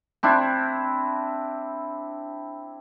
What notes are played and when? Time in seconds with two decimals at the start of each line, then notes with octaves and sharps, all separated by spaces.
0.23 C4 D4 E4